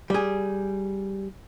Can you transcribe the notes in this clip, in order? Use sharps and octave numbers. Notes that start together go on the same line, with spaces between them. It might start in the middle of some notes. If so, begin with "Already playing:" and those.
G3 G#4